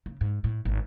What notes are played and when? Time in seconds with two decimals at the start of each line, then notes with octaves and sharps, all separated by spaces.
0.06 C#3
0.21 G#2
0.44 A2
0.65 G#1